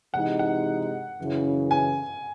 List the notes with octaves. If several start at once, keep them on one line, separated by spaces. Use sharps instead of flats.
C3 E3 G#3 D#4 F#5
F#5
F#2 C#3 E3
G#5